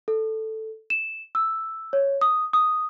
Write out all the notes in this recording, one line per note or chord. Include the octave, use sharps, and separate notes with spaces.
A4
E7
E6
C#5
D#6
D#6